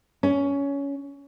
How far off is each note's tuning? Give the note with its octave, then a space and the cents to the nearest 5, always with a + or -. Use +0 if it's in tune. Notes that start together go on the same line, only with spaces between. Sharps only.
C#4 +15